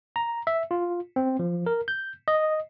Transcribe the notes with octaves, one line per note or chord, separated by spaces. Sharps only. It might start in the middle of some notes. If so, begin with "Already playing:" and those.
A#5
E5
F4
C4
F3
A#4
G6
D#5